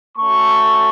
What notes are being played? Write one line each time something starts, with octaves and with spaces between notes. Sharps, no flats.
A3 C#4 F#4 A5 C#6